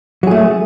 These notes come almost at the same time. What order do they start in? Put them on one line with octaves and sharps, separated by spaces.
F#3 G#4 A3